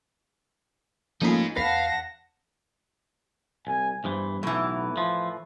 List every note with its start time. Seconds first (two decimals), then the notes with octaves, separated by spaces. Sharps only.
1.21 F3 A3 A#3 C#4 D#4 F4 G#4 B5
1.57 E2 B4 F5 F#5 A5 A#6 B6
3.67 C2 G#5
4.04 E2 G2 E3 C5
4.43 B1 A2 E3 F#4
4.97 F3 E5